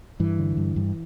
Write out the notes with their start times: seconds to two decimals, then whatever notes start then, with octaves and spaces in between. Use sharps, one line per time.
0.20 G2 E3
0.39 D3
0.57 G2
0.76 G2